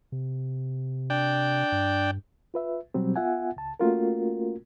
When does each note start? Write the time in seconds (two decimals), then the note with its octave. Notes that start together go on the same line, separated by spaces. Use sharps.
0.12 C3
1.10 D4 G5
1.72 G2
2.54 F4 B4 E5
2.94 B2 F#3 G3 C4
3.16 B3 F4 E5 F#5 G#5
3.56 C#2 A5
3.80 A3 A#3 C#4 F4 F#4 A#4